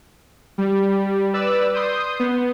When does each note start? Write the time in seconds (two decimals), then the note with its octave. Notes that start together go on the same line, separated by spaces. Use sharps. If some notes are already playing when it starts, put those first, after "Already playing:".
0.58 G3
1.34 B4 D5 E6
1.74 C6 D#6 G6
2.20 B3